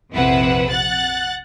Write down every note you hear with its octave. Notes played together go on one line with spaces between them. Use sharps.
A#1 F2 C3 E4 B4 F#5
F#5 F#6 A6